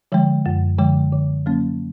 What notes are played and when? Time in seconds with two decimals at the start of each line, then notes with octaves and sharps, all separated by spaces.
0.12 D3 F3 G#3
0.46 F#2
0.79 D3 F3 G#3
1.12 D3
1.46 F#3 A#3 C#4